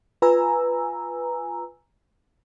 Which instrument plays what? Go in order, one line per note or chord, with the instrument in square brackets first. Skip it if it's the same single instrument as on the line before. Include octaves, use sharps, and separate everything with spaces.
[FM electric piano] F4 B4 G#5 A#5 E6